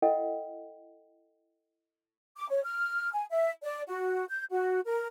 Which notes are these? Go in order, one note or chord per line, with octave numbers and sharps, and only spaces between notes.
E4 A4 D#5 F#5 G5
D6
C#5
F6
G#5
E5
D5
F#4
G6
F#4
A#4